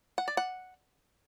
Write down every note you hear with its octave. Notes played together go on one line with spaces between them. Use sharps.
F#5
D5
F#5